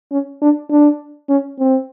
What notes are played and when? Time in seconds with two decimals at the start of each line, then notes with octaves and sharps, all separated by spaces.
0.12 C#4
0.42 D4
0.71 D4
1.29 C#4
1.59 C4